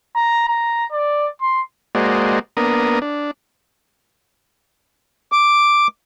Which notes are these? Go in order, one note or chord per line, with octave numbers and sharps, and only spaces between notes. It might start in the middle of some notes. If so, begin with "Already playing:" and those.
A#5
A#5
D5
C6
G#3 A#3 F#4 C5 D5 D#5
A#3 B3 D4 A#4 D#6
D4
D6